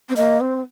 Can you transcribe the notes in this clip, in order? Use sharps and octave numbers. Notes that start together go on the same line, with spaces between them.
C4
A#3 D#5
C4